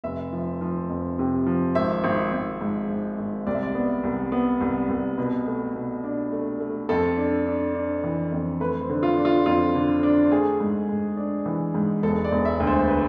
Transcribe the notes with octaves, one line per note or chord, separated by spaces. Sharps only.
F1 E5
F3
F3
F2
C3
F3
G#1 E5
G#1
G#1
G#2
G#1
G#1
C2 D5
E5
D5
B3
C2
B3
C2
C2
B2 B4
A3
B2
D4
A3
A3
F2 A4
D4
D4
D4
E3
F2
A3 B4
C5
D3
F4
D4
F4
F2 F4
D3
D4
A3 G#4
G#2
G#2
D4
E3
G#2
E1 A4
D5
E1
E5
D2
C5
B4